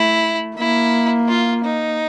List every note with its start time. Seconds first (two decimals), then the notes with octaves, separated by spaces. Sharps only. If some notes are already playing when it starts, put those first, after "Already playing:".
Already playing: A3 E4
0.57 A#3 E4
1.28 F4
1.64 D#4